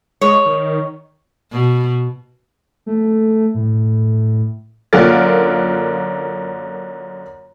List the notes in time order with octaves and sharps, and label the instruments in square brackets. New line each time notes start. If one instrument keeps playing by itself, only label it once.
[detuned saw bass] G#3 [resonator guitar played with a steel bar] C#5
[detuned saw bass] D#3
[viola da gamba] B2
[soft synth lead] A3
A2
[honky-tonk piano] F#2 D3 A#3 F4 A#4 A6